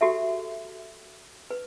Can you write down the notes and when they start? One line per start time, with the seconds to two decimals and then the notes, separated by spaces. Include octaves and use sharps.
0.01 F#4 G4 A4 E5
1.51 B4